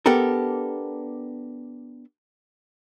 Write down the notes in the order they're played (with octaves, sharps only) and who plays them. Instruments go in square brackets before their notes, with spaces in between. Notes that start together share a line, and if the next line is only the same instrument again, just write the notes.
[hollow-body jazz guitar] B3 D4 G4 A4 A#4